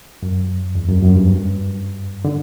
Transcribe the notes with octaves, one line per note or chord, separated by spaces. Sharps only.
F#2
E2
F#2
F#2
G2
D3